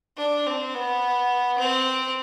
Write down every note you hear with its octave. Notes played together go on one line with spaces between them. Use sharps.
D4
C4
B3
C4